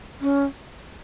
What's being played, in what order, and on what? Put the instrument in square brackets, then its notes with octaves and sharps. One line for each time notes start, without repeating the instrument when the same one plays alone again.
[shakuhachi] C#4